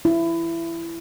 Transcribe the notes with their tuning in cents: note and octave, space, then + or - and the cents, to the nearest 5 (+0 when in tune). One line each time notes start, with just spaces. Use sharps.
E4 +20